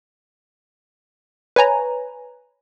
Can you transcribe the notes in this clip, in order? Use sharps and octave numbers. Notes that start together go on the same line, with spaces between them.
B4 C#5 G#5 A#5